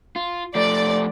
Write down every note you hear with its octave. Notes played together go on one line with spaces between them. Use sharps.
F4
F3 A3 D5